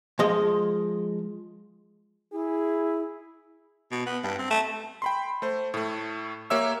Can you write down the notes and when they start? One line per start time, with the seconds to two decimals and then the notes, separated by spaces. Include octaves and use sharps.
0.19 F3 G#3 D#5
2.33 E4 G#4
3.91 B2
4.06 B3
4.23 G2
4.39 C4
4.50 A3
5.02 G5 B5 C6
5.42 A3 C5
5.74 A2 A3
6.50 A#3 G4 C#5 E5 E6